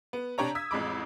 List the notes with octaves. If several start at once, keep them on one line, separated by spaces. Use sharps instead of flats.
B3
C3 D4 G4 C#5 A#5
D#6 E6 G#6 B6
A1 F2 G#3 B5 D6